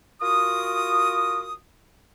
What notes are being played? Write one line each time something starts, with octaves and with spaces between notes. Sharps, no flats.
F4 F#4 A#4 D#6